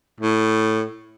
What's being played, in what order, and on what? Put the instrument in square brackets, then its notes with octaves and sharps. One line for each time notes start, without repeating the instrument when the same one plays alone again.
[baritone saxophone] A2